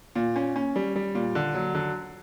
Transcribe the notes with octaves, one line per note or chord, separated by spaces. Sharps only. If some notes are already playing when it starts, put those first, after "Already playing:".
A#2
C#4
C#4
G3
G3
A#2
D3
F#3
D3